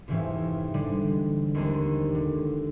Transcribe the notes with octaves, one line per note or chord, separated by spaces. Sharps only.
F2 G#2 C3 E3 C4 C#4
D3 G3 G#3 D4
D#2 G#3 C4 D4
D3